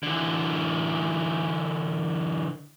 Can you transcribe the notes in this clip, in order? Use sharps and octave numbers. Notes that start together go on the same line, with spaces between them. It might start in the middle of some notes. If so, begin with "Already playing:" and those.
D3 E3